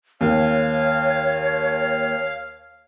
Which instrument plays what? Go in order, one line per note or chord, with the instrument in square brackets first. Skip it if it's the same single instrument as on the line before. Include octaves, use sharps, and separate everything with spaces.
[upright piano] D#2 [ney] C#5 [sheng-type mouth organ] F5